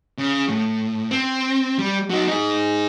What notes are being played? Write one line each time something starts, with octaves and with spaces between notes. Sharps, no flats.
C#3
A2
C4
G3
F#3 D#4
D#4 G#4